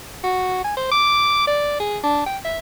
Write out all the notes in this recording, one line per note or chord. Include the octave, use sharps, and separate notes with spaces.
F#4
G#5
C5
D6
D5
G#4
D4
G5
E5